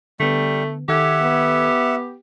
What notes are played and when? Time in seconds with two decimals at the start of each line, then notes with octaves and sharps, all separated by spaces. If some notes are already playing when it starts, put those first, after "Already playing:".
0.20 D3 G3 A3 B3
0.89 D#3 G4 A4 E5 F#5 G#6
1.22 B3